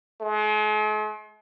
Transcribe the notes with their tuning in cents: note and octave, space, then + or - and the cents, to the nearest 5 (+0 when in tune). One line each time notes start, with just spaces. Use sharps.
G#3 +45